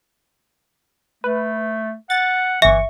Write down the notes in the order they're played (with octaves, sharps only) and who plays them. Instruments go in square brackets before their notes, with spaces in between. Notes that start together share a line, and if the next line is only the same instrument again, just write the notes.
[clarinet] A3 [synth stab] B4
[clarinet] F#5 [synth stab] A6
[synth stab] G1 C#6 [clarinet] E3 [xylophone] E5